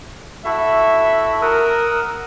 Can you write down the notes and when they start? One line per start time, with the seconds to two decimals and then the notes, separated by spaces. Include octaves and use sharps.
0.45 E4 F#4 A4 E5
1.42 A#4 F#5 D#6 E6